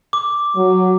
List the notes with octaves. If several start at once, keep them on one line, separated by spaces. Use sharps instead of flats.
D6
F#3